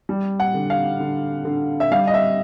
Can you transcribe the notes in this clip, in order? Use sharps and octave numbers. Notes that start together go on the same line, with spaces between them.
G3
F#5
D3
F5
D3
D3
E5
G3 F5
D#5
E5